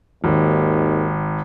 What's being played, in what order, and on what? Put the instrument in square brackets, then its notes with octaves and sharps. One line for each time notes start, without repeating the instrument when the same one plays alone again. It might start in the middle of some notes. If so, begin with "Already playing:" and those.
[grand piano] G#1 [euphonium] D#2